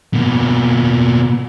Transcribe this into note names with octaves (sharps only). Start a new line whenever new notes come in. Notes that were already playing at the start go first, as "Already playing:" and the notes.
B2 A#3